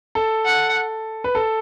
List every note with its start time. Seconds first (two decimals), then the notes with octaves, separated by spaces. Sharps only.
0.15 A4
0.45 F#5
1.24 B4
1.35 A4